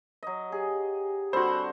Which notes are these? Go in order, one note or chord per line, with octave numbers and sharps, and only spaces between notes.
F#3 D#5
G4 G#4
D3 G3 C4 F#4 C5 B5